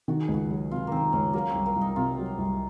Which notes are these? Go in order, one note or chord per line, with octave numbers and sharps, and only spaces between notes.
D#3 F#4
G#4
C#2
F#4
F#3
C3 F4
D#3 A#3 C4
C#2 C#4
F#3 A#3
C4
C2
A#3
C2
D#4
C3 F4
F#3
C2